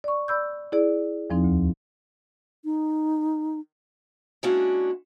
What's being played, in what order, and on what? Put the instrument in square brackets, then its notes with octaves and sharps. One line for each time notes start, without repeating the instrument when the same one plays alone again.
[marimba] D5 C#6
D5 B5 E6 G6
E4 G#4 D5
E2 F3 C4 D#4
D2
[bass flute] D#4
[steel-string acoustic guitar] G#3 A#3 C#4 D4 E4 F#4